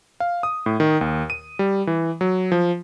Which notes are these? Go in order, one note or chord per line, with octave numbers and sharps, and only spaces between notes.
F5
D#6
A2
D#3
D#2
D#7
G3
E3
F#3
F3